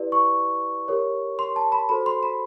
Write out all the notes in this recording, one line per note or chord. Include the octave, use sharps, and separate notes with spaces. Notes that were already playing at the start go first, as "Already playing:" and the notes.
Already playing: E4 G4 B4 D5
C#6
G4 A#4 C#5
C6
A5
B5
F#4 A4 C5 B5
C6
B5